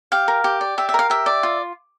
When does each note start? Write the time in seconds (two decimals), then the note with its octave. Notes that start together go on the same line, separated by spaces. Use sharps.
0.12 G4 F5
0.28 A#4
0.44 G4
0.61 D5
0.78 G4 E5
0.89 E5
0.94 A#4 F5
1.10 G4 E5
1.26 D5
1.43 F4